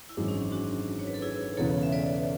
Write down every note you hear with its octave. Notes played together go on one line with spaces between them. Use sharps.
E4
G#1 F#2 E3 G#3 D4
C#4
D4
D4 F#4
C#5
B4
A4
E4 G#4
E1 E2 C#3 E3 B3 A4 C#5
E5
B4 D5